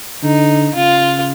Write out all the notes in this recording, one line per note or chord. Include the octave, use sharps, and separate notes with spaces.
D3 D#4
C#3 F4